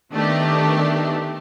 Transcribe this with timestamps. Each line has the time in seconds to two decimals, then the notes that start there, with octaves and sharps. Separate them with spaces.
0.12 D#3 A3 B3 D4 G4